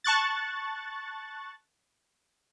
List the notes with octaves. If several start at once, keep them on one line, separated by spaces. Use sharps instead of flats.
A5 C#6 F#6 A6